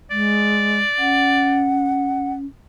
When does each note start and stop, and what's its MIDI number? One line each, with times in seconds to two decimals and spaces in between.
0.11 0.80 56
0.11 1.67 74
0.98 2.46 61
0.98 2.33 78